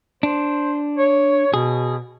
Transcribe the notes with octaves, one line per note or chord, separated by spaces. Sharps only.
D4 C5
C#5
B2 G#4